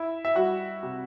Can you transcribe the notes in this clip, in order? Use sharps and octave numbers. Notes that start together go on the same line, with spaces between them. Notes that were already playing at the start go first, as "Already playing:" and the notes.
Already playing: E4 E5
E5
G3 F#4 F#5
C3